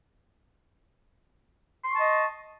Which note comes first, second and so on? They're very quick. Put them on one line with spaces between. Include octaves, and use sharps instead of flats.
C6 C#6 A5 D#5